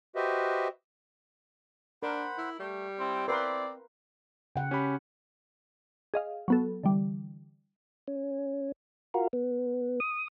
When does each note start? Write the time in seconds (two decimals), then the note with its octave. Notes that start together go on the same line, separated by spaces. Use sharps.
0.16 F#4 G4 B4 C5 D#5 E5
2.03 D4 A#4 C5 F#5 B5
2.38 E4
2.59 G3 A3
2.99 C4 E4
3.28 C4 A#4 B4 D5 C6
4.56 C#3 F#5 G5
4.71 C#4 G4 B5
6.14 G#4 D#5 F5
6.48 F#3 B3 A4
6.83 D3 E3 G3
8.08 C#4
9.14 F4 F#4 A#4
9.33 B3
10.00 D#6